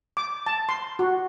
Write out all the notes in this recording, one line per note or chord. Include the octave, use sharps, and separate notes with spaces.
D6
A5
C6
F#4